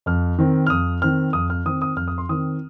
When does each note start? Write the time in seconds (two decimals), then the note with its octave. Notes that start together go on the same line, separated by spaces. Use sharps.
0.06 F2 F6
0.38 D#3 C4
0.67 F6
0.70 F2 D#6
1.02 D#3 C4 F6
1.33 F2 D#6
1.50 F6
1.65 D#3 C4 D#6
1.82 D#6
1.96 F2 F6
2.08 D#6
2.18 C6
2.29 D#3 C4 D#6